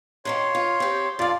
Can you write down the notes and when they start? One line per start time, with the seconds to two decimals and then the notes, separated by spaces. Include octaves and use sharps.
0.25 F#2 D#3 A#3 C#5 C6
0.55 F4
0.80 C4 G4
1.19 F2 F4 D5 F5